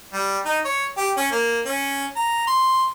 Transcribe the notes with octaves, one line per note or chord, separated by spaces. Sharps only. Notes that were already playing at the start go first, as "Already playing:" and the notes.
G3
D#4
C#5
G4
C#4
A#3
C#4
A#5
C6